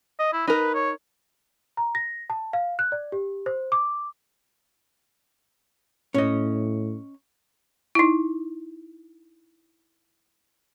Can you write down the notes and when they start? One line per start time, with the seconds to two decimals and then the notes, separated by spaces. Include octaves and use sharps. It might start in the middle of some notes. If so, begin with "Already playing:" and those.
0.19 D#5
0.33 E4
0.47 D#4 A#4 B4
0.75 C#5
1.77 A#5
1.95 A#6
2.30 A5
2.53 F5
2.79 F#6
2.92 D5
3.12 G4
3.46 C5
3.72 D6
6.14 A2 C#4 D#5
7.95 D#4 E4